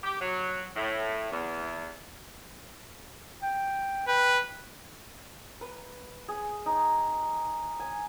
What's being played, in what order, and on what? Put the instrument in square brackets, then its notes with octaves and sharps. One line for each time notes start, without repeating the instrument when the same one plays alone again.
[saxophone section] G4
F#3
A2
E2
[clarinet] G5
[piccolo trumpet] B4 [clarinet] G5
[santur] B4
G#4
D#4
G#5